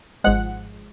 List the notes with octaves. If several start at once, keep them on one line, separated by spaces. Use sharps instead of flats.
G#1 G#2 F3 G#3 F#5